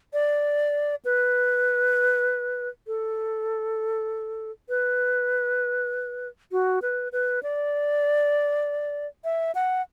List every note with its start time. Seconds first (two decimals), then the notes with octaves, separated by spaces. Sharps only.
0.13 D5
1.05 B4
2.87 A4
4.69 B4
6.52 F#4
6.82 B4
7.12 B4
7.43 D5
9.24 E5
9.55 F#5